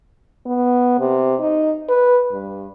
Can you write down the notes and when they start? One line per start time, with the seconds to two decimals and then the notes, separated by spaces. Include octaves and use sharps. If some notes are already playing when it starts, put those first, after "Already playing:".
0.46 B3
0.99 C3
1.41 D#4
1.89 B4
2.32 G2